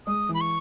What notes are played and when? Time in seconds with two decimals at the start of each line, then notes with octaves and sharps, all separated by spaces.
0.07 G#3 D#6
0.29 E3
0.34 B5
0.41 C#6